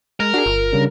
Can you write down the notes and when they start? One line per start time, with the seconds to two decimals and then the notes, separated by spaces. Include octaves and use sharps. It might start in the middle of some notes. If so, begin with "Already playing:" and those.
0.20 G#3 A#4
0.34 D4 F#4 G#4
0.46 G1 F4
0.73 C#3 G3 D4